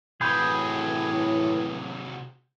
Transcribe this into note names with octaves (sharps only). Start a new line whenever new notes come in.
A2 C3 E3 F#3 G#4 B5 G6